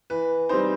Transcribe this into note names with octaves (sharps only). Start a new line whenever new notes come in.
E3 B4
G3 C4 D#4 C5